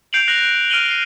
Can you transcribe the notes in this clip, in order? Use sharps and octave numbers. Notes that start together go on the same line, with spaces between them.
G6 C7 D7 F7 F#7
F#6 A#6 F7 F#7
F6 D7 D#7 F#7 G7
C7